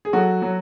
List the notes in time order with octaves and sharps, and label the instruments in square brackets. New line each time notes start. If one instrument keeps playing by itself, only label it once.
[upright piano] G#4
F#3 F#4 A4
F#3